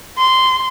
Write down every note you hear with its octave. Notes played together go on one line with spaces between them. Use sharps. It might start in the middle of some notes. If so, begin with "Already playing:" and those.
C6